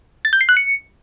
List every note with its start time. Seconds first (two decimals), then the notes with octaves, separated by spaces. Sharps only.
0.25 A6
0.33 G6
0.41 C7
0.49 F#6
0.57 C#7